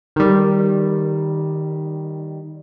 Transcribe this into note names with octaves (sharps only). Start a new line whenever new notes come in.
D#3 G3